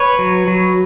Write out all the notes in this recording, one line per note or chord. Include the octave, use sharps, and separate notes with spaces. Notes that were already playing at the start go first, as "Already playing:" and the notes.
Already playing: B4 C#5
F#3
F#3